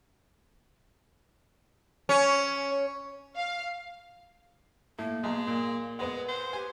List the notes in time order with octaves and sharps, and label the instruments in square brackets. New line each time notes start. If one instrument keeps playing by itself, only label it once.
[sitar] C#4
[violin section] F5
[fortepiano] A2 [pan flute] A#3
[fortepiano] B1 A#5 [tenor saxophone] G#3
[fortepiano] A#2
[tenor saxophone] G#3 [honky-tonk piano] B3 B4 F#5
[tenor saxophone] C5
[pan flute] G4 [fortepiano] G#5